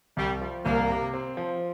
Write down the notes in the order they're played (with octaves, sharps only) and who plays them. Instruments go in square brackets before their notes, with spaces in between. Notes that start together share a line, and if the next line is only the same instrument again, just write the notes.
[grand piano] C2 [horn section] G3
[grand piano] F3
[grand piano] C2 [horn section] A#3
[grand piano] C3
C4
F3